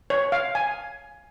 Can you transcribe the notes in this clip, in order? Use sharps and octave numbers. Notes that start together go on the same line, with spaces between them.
C#5
F5
G#5